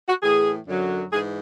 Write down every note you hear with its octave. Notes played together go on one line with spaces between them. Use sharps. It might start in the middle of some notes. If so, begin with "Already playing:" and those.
F#4
A2 E3 G#4
F#2 D3 F#3
G#2 E3 G#4